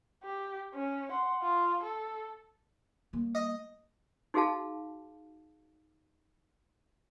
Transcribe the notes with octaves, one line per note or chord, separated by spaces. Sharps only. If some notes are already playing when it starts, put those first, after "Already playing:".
G4
C#4
F#5 C6
F4
A4
G3 A#3
D#5
D#4 F#4 G#4 F5 A5